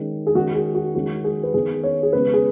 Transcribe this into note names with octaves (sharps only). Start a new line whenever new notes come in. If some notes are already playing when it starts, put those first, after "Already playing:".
Already playing: D#3 G#3 C#4
G#4
D#3 G#3 C#4 F#4
G#4
F#4
D#3 G#3 C#4 F#4
G#4
B4
D#3 B3 G#4
C#5
G#4
C#3 G#3 B3 B4
G#4